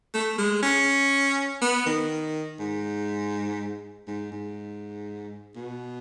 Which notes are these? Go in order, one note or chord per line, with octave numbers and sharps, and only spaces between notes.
A3
G#3
C#4
B3
D#3
G#2
G#2
G#2
B2